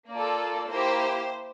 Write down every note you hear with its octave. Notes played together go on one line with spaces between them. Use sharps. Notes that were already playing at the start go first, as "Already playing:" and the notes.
A#3 F4 A4 D5
A#3 E4 G4 C5